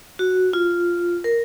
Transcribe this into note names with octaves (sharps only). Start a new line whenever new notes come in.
F#4
F4
A#4